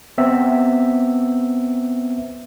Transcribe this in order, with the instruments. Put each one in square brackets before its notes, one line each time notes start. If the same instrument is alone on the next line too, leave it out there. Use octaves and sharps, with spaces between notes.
[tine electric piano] B3 C4 E5